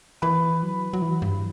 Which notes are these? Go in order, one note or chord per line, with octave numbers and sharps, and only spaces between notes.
E3 B4
F#3
F#3
E3
G2